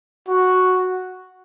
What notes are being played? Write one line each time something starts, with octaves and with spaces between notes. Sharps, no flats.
F#4